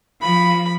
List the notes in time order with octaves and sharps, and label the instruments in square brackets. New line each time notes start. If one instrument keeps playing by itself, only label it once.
[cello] F3 [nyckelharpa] B5